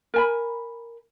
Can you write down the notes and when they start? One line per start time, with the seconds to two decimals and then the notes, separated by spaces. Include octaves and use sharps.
0.14 A#4 G#5 B5